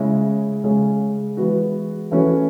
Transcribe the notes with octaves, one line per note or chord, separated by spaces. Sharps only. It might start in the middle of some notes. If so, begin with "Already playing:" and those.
Already playing: C#3 G#3 C#4 E4
C#3 G#3 C#4
E3 G#3 B3 F#4
E3 A3 C#4 F#4